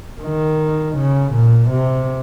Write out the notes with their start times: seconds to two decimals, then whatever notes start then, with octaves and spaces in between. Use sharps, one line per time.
0.21 D#3
0.96 C#3
1.32 A#2
1.69 C3